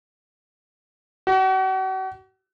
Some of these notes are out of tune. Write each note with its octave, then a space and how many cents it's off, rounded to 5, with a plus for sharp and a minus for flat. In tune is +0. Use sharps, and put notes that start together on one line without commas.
F#4 +40